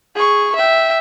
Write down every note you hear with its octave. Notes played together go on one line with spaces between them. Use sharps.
G#4 C#6
E5 G5